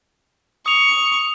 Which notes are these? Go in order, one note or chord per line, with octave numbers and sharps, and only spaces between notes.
C#6 D#6 F7